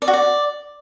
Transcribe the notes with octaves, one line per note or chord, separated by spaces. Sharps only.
D5
F#4
D5